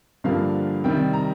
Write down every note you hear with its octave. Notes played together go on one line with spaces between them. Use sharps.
G2 D3 F3 A#3 F5
C3 D#3 G3 G5
A#5